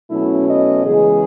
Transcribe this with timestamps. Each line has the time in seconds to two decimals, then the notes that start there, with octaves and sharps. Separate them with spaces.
0.10 B2 F#3 A3 C#4 E4
0.48 D#5
0.85 C#3 E3 G#3 B3 G#4